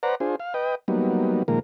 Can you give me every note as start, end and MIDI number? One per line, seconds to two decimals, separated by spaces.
0.03 0.15 71
0.03 0.15 72
0.03 0.15 74
0.03 0.15 78
0.03 0.15 82
0.20 0.36 62
0.20 0.36 65
0.20 0.36 68
0.20 0.36 72
0.40 0.54 77
0.54 0.75 71
0.54 0.75 75
0.54 0.75 79
0.88 1.43 54
0.88 1.43 55
0.88 1.43 58
0.88 1.43 59
0.88 1.43 63
1.48 1.59 46
1.48 1.59 51
1.48 1.59 53
1.48 1.59 56
1.48 1.59 58
1.48 1.59 70